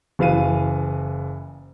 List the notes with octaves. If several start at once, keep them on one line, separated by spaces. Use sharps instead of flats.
F#1 E3 F5 D#7